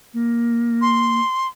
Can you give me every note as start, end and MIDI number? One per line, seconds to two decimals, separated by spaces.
0.14 1.19 58
0.82 1.48 84